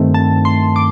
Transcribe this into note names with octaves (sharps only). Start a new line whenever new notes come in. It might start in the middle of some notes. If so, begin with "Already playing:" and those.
Already playing: G2 D#3 A3 C4
A5
C6
D6